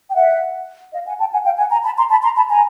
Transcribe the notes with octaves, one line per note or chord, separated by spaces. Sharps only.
G5
E5 F#5
D#5 F5
F#5 G#5
G5 A5
F#5 G#5
F5 G5
F#5 G#5
G#5 A#5
A5 B5
A#5 C6
A5 B5
A#5 C6
A5 B5
G#5 A#5